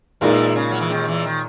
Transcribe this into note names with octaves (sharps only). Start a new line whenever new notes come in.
E2 A#2 E3 G#3 D#4 A#4
C#3
F#3
E3
D#2 D#3
E2 E3
D#3